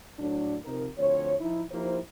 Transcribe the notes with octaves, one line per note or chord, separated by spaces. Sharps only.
A2 F#3 D4
C3 F3 D#4 A#4
D2 F3 C4 C#5
F3 D#4 E4
F3 A#3 D#4 E4 G4 C5